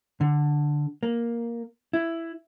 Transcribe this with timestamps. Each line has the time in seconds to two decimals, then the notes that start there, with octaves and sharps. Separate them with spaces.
0.21 D3
1.03 A#3
1.93 E4